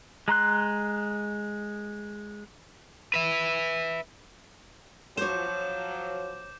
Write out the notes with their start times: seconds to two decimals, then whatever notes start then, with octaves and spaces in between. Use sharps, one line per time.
0.28 G#3 A#5 C6 F#6
3.14 B4 E5
5.17 F3 F#3 C5 C#5 D6 G6 E7